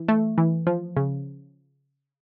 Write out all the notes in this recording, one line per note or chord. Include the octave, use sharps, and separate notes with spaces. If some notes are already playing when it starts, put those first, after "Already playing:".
Already playing: E3
A3
E3
F3
C#3